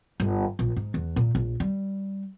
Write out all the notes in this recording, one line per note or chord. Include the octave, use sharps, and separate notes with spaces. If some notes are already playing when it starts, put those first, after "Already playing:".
G1
A#1
G#2
E2
A#2
A#1
G3